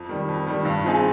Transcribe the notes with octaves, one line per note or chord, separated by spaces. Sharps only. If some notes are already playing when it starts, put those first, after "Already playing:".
Already playing: F2
D#3 G3
F2
D#3 G3
G2
F3 C4 D#4 G#4